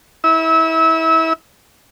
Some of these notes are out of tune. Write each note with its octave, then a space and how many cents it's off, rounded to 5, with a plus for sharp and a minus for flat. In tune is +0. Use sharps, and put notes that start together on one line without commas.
E4 -30 E6 -25